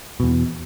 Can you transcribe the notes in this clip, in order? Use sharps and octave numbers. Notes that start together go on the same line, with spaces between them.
E2 B2